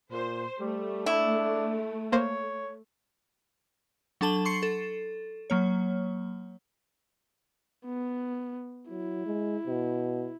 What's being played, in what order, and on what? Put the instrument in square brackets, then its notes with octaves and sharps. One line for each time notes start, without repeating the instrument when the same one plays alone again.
[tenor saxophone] A#2 [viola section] C5
[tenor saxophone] G3 [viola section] A3
[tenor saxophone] D4 [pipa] E4
[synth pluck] A#3 C5 [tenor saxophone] C#5
[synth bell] F#3 D4 A4 A5 F#7 G7
C6 C#6 C7 C#7
A4
F#3 A#3 C#5
[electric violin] B3
[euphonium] F#3 [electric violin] E4
[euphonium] G#3
B2